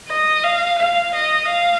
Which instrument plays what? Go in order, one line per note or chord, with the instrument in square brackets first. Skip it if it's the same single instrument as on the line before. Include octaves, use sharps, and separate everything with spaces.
[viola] D#5
F5
F5
D#5
F5